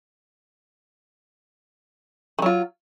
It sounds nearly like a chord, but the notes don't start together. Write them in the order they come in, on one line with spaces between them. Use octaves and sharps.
D#3 F#3 F4